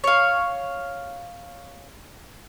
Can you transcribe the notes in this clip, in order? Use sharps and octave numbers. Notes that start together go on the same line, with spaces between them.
C#5 F5